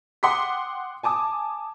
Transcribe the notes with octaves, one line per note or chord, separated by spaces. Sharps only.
F#5 G5 C6 D6 D#6 B6
G#5 A5 D6 D#6